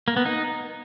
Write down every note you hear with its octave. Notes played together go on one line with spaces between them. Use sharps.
A#3
B3
D#4